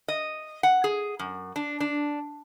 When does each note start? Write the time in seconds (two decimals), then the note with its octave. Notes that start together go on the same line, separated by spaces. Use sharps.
0.08 D#5
0.63 F#5
0.84 G#4
1.19 F#2
1.56 D4
1.80 D4